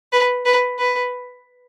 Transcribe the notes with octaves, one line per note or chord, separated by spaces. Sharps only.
B4
B4
B4